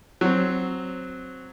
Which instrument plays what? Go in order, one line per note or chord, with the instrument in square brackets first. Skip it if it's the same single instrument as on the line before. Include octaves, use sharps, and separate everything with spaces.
[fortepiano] F#3 C4